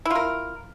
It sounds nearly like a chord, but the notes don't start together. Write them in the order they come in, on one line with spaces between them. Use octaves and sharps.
E4 F4 A#4